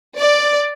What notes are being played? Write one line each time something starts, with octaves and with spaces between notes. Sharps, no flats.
D5